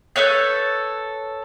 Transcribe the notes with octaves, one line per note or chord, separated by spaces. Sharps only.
A4 B4 C#5 G6